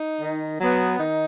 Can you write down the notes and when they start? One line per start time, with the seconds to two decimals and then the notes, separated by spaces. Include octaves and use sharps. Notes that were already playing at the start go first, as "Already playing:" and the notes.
Already playing: D#4
0.20 D#3
0.59 F#3 B3
0.98 D#3 D#4